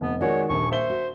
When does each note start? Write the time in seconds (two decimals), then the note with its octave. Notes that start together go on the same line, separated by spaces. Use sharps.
0.01 F1 B3
0.21 D#3 G#3 F#4 C#5 D5
0.49 D#1 A#1 C#6
0.72 C5 E5 G7
0.90 F#4